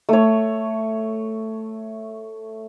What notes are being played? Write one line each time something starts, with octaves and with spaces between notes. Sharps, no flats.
A3 C#5